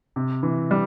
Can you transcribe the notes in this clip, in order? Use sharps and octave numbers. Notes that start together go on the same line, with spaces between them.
C3
E3
G3